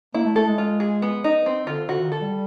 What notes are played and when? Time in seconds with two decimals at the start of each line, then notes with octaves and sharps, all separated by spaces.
0.14 A#3 E4
0.25 A3
0.36 A3 A4
0.47 G#3
0.58 F4
0.80 G#4
1.02 B3
1.24 D#4
1.46 C4
1.67 D3 F4
1.89 D3 F#4
2.01 D#3
2.11 D3 A4
2.22 G3